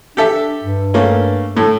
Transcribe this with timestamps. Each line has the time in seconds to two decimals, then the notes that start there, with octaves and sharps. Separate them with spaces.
0.17 D4 G4 A4 E5
0.64 G2
0.94 A3 A#3 C#4
1.57 A2 A4